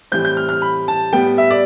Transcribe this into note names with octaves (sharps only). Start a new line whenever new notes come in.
A2 E3 G3 C4 G6
G6
F6
F6
B5
A5
A2 G3 B3 G5
E5
D5